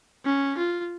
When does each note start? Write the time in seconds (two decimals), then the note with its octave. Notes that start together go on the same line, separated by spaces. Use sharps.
0.25 C#4
0.57 F4